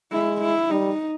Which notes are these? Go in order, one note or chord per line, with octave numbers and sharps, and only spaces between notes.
G#3 E4
E4
G3 D#4